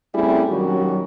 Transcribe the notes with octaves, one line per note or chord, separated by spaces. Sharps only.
G3 A3 C4 C#4 E4 G#4
A#2 D#3 F#3 G3 C#4 F#4